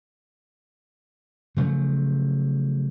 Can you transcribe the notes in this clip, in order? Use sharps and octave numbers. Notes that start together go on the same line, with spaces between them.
C#3 F3 F#3 A3